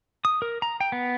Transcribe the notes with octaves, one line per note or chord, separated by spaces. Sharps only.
D#6
A#4
A#5
G5
B3